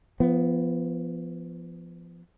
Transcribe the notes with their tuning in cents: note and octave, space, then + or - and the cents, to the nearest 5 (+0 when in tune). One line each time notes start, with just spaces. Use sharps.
F3 -25 B3 +0